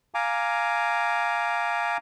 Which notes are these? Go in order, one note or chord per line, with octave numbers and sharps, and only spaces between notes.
F5 G#5 A#5 D6